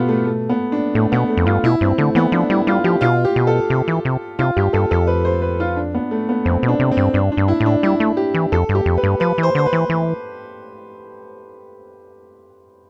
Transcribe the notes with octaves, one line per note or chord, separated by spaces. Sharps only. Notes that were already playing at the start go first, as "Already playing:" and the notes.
Already playing: B2 B3 F4 G4 A4
A3
A3
B3
D4
A2 A3
B2 B3
A3
F2
G2 F4
B2 E4
G2 C4
D3 A3
E3 B3
F3 D4
G3 E4
G3 F4
F3 G4
B2 F4
G4
B2
A4
C3
E3
C3
C3 F4
G2 G4
G2 A4
F2 A4
B4
C5
B4
F4
D4
B3
A3
B3
F2 C4
B2
D4
C3
C4
G2
G2 D4
D4
G2
E4
A2
D4
G3 E4
A3
G4
E3
F2 A4
G2
G4
F2
B4
G2
F3 B4
E3
C5
D3 C5
B4
E3
E3